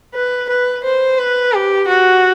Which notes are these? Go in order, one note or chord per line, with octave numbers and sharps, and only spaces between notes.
B4
B4
C5
B4
G4
F#4